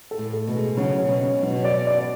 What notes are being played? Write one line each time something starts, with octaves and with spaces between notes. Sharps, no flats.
A4
A2
A4
B2
G#3
C#3 F#3
C#4
B2
C#4
B2
F#3
D5
D5